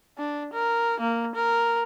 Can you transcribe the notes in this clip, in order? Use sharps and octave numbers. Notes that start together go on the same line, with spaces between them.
D4
A#4
A#3
A#4